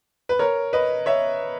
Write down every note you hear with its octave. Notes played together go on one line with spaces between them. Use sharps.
B4
A#4 C#5
B4 D#5
C#5 E5